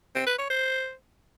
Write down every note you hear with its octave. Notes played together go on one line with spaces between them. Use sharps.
C4
B4
C#5
C5